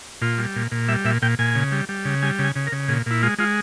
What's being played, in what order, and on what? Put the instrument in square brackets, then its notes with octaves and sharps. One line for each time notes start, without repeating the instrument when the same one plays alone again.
[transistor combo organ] A#2 F4
G3
A#2
A#2
G3 E5
A#2 E5
A#2 G5
A#2 G#5
C#3
G3
G3
C#3
G3 G#5
C#3
G#5
C#3
A#4
C#3
A#2 G#4
A#2 E4
G#3 F4
G#3 F4